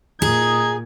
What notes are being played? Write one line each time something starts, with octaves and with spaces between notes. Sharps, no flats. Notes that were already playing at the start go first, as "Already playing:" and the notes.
A#2 D#4 G#4 G#6